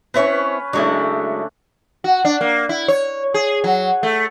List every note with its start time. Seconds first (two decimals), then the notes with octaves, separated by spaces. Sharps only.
0.14 C4 C#4 E4 B4 C#5
0.73 C#3 F#3 G#3 A3 D4 E4
2.04 F#4
2.25 D4
2.41 A#3
2.69 E4
2.88 C#5
3.34 G#4
3.64 F#3
4.03 A3